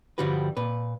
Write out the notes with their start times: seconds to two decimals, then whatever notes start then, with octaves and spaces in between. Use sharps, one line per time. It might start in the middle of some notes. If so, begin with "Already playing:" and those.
0.18 G2 D3 F3 G3 F#4 B4
0.57 A#2 B4